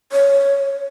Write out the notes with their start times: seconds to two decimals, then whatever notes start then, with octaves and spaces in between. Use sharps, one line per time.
0.12 C#5